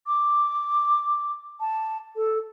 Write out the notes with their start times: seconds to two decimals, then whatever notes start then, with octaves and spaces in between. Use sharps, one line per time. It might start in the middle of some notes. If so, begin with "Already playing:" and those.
0.06 D6
1.60 A5
2.15 A4